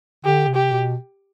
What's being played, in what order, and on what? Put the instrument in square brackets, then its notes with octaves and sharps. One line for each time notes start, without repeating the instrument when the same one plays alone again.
[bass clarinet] D3 [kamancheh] G4
[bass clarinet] C3
[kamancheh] G4
[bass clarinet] B2